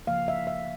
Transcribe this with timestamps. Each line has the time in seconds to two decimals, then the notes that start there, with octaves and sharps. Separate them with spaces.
0.07 C#3 F3 A#3 F5
0.28 E5
0.47 E5